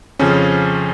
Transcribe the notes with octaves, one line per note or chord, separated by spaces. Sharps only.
F2 C#3 F3 C#4